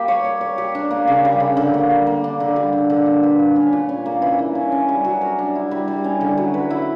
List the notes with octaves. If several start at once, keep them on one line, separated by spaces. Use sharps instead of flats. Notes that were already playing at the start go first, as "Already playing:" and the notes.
Already playing: G3 A#3 G4
C#5
C#5
C#5
G4
D4
A#3
C#3
G3
C#3
D3
A#3
G3
A#3
D4
D3
G3
D3
D3
A#3
B4
B4
C#4
A#2
C#4
A#3
E3
A#3
C#4
C#4
G3
F#3
A#4
D4
E4
G3
G3
C#4
D3
F#3
B4
E4